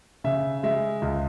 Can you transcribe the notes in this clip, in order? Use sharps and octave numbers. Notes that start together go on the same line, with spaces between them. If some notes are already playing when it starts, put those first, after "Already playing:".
C#3 E5
G#3 E5
C#2